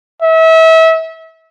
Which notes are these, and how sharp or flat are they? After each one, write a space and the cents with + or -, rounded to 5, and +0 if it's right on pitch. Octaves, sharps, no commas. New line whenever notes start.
E5 -30